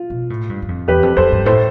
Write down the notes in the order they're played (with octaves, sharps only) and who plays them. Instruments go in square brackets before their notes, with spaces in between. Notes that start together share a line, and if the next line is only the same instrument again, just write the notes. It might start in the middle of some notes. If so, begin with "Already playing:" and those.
Already playing: [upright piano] F4
[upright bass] B2
A2
G2
G2
F2
[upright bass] E2 [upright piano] G4 B4
[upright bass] F2
[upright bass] F2 [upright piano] A4 C5
[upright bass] G2
[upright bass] A2 [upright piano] A4 C5